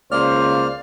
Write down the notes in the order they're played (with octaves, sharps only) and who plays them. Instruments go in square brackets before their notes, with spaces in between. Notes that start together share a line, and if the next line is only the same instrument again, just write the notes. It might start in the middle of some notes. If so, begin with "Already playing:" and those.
[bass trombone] C#2 [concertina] A#3 F6 [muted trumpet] C5 [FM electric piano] D5 F5